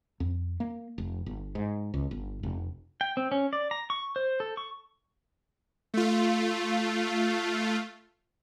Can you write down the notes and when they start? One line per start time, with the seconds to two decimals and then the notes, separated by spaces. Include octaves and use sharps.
0.20 F2
0.60 A#3
0.98 F1
1.26 G1
1.55 G#2
1.94 C#2
2.11 G1
2.43 F1
3.01 G5
3.17 C4
3.32 C#4
3.53 D5
3.71 A#5
3.90 C#6
4.16 C5
4.40 A4
4.57 C#6
5.94 A3 F4